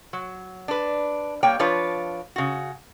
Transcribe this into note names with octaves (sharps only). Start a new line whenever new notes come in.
F#3
D4 B4
G3 A#3 C#5 G5
F3 D4 F4 B4 C#5
C#3 F#4